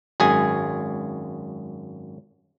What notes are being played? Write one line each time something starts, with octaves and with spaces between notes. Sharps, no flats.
G#1 F#2 G#4 G#5